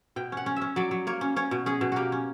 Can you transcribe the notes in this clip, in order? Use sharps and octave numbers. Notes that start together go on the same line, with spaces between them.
B2 G5
C#4 F#5
C#4
E5
C#4
F#3 D5
F#3
A#3 C#5
C#4
C#4 C#5
B2
C#4 G#4
B2
A#3 F#4 G4
C#4